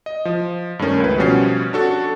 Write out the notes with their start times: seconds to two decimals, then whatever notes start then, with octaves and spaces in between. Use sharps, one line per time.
0.06 D#5
0.25 F3
0.79 G2 D#3 A3 C#4 A#4
1.00 C#2 B4
1.18 B2 F3 G3 C#4 F#4 C7
1.73 D4 F#4 A4